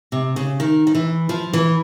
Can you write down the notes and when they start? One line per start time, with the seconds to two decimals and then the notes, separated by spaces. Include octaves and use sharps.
0.12 C3
0.36 C#3
0.60 D#3
0.87 D#3
0.95 E3
1.29 F3
1.53 E3